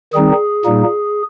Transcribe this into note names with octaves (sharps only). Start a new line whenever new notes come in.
D#3 G3 C4 D#4 G#4
A#2 G3 A#3 D#4